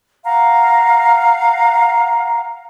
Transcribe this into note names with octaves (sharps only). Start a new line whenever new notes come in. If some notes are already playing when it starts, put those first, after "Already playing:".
F5 F#5 A#5